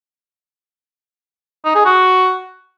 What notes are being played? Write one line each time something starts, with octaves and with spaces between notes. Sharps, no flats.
D#4
G#4
F#4